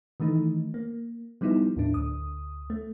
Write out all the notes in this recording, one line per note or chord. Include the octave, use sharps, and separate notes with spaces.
D#3 E3 A3 D#4
A#3
F3 G3 B3 D#4 E4
D#2 A2 D4
D2 D#6
A3